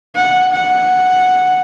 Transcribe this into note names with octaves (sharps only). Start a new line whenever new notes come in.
F#5
F#5